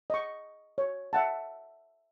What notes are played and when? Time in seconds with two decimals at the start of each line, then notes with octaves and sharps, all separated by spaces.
0.10 D#5 C#6
0.78 C#5
1.13 E5 F#5 A5